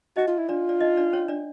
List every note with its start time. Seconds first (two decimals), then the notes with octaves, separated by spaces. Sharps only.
0.16 D#4 F#4 D#5
0.28 F4
0.38 E4
0.49 D4 F4 D5
0.69 D5
0.81 D#4 D#5
0.97 D4 D5
1.13 C#4 C#5
1.28 D4 D5